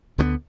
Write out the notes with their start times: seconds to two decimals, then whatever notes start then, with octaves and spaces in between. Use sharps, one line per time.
0.18 D2 D3 G3 B3